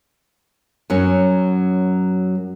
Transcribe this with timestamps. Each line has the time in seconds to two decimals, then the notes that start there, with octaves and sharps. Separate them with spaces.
0.90 F#2 F#3 C#4